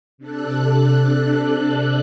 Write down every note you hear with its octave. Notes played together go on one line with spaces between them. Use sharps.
C3 D4 A4 F#6